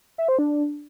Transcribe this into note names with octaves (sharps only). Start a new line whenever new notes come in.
E5
C5
D4